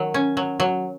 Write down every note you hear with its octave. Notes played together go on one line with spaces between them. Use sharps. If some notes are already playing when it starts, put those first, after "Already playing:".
Already playing: D#3 F#3
C#4
F#3
F#3